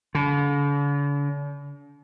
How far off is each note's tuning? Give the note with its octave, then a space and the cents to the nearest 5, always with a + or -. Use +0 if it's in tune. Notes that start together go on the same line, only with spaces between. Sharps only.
D3 -45